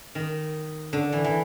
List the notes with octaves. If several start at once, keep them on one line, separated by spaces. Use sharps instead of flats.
D#3
D3
E3
E3